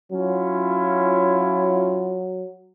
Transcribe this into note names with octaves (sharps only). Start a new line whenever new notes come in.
F#3 C#4 E4 F4